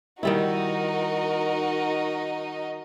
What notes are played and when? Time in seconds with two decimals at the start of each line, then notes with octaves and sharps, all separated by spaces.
0.23 D#3 G3 D#4 E4 F#4 A#4 D#5